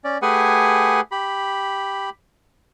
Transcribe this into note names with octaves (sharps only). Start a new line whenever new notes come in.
C#4 D5
A3 G4 G#4 B4 F#5 G#5
G4 B5